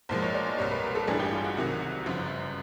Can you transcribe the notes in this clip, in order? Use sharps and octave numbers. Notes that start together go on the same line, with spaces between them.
B1 A#2 F3 G#3 C5
C#5
D5
D5
C2 A#2 G3 C#5
B4
A#4
A4
A1 G2 E3 G3 G#4
G4
F4
F#4
C2 C3 D#3 F#3
G1 F#2 C#3 F3